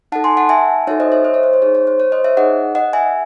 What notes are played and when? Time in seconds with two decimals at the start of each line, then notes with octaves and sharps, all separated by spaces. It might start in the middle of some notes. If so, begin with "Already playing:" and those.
0.12 D#4 F#5 A5
0.16 A4
0.24 G#5 C6
0.37 F#5 A5
0.49 E5 G#5
0.87 D#4 F#4 A4 C#5 E5
1.00 C5 D#5
1.12 C#5 E5
1.24 C5 D#5
1.34 C#5
1.43 C5
1.53 C5
1.62 D#4 G#4 C#5
1.75 C#5
1.87 C5
2.00 C#5
2.12 C5 D#5
2.24 C#5 E5
2.37 D#4 G#4 D#5 F#5
2.75 D#5 F#5
2.93 E5 G#5